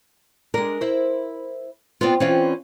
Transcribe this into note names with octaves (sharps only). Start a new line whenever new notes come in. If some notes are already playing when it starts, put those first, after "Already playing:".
G#3 D4 A#4
E4 C5
B3 C4 F4 D5
E3 C4 C#4 F4 D5 F5